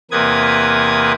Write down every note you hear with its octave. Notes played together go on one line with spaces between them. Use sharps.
E2 C3 A#3 B4 D#6 G#6